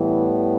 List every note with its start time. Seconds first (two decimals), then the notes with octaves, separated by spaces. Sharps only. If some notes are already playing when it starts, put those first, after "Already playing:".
Already playing: A2 E3 G3 B3